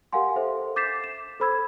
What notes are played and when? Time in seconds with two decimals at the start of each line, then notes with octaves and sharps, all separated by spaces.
0.13 G4 A#4 F5 F#5 G#5 C6
0.36 A4 C5 E5
0.76 D6 G6 A6 B6 C7 E7
1.04 E7
1.40 A4 C5 B5 E6 G#6